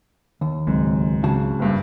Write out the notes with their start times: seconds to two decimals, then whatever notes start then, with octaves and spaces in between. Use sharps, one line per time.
0.41 D#2
0.67 C#2 G#2 F#3 C4
1.24 C#3 F#4 A5
1.59 F#1 G2